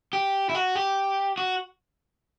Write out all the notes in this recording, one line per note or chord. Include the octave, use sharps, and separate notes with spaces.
G4
E4
F#4
G4
F#4